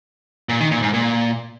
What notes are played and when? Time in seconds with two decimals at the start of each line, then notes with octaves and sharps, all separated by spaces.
0.49 A#2
0.60 D#3
0.71 A#2
0.82 G#2
0.94 A#2